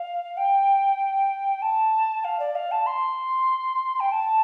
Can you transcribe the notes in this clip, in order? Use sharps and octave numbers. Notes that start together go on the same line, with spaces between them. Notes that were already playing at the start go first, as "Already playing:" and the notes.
Already playing: F5
G5
A5
F5
D5
F5
A5
C6
G5
A5